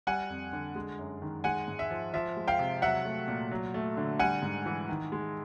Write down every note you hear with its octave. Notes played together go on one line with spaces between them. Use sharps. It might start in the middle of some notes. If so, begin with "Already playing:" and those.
G3 F#5 G#5
F2
D3
G#3
F#2
D#3
G#3 F#5 G#5
G#2
E5
F3
F3 E5
G#3
F5 G5
C3
F#3 E5 F#5
A3
A#2
F#3
A3
D3
G3 F#5 G#5
G#2
E3
D#3
G#3